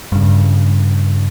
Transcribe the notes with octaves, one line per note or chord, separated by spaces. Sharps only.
G2 C#3